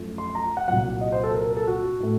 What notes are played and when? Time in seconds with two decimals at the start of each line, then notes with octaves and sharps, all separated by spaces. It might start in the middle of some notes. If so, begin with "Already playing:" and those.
Already playing: F#2 F3 A3
0.18 C6
0.35 A#5
0.57 F#5
0.68 C2 A#2 F#3 F#5
1.01 D#5
1.12 C5
1.24 A4
1.35 A#4
1.45 A#4
1.57 A4
1.68 F#4
2.00 A2 A3